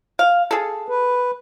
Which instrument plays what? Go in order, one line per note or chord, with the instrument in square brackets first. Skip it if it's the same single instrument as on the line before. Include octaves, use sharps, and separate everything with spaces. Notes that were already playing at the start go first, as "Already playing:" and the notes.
[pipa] F5
G#4 A4
[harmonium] B4